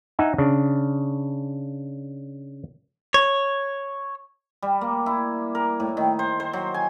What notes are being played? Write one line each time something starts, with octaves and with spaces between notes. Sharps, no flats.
D#4 E5 F#5 G#5
C#3 D4
C#5
G3
A#3
E4
A#4
A2
D#3
C5
C5
F#3
G#5